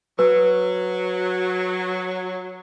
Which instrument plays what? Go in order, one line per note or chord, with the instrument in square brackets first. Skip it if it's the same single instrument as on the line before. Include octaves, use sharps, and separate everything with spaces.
[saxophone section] F#3 [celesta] B4